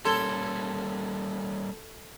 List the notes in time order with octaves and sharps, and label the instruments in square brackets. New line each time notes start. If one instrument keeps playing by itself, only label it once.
[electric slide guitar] G3 A#3 C#4 [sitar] A4 [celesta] C6 G#6 G7